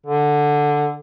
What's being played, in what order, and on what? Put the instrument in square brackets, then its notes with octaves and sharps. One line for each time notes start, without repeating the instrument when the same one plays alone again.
[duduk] D3